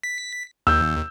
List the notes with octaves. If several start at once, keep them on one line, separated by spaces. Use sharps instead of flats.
B6
D#2 E6 G6